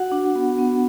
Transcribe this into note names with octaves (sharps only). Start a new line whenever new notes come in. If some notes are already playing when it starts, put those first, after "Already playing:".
Already playing: F#4 F#5
D4
B3
B3